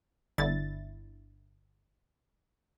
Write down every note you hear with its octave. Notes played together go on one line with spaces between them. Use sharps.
G1 D3 E4 A6